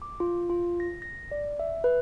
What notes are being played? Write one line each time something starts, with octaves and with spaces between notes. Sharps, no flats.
D6
F4
F4
A#6
A#6
D5
E5
B4